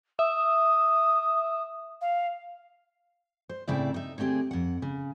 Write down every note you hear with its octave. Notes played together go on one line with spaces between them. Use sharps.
E5 D#6
F5
C5
A2 C#3 C4 E4 D5 E5
D#4 E5
D3 A3 C4 G4 G#4
F2 F#5
C#3